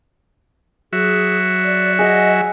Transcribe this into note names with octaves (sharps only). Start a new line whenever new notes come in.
F#3 F#4 G#4 E5
D5
G#4 D#5 F#5